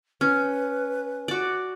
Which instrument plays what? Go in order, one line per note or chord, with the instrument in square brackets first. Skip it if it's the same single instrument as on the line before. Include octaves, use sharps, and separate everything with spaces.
[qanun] C#4 [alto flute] B4
[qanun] F#4 D5